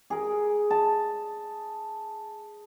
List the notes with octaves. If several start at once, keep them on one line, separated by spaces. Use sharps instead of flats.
G#4 A#4
A5